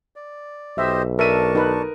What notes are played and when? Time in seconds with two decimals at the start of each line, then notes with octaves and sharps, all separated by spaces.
0.16 D5
0.78 B1 G4 C5 D#5 E5
1.19 D4 A#4 E5 A5 C#6 D#7
1.55 D#4 A4 B4